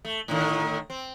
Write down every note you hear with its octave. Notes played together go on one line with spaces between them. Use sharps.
A3
A2 D3 D#3
C4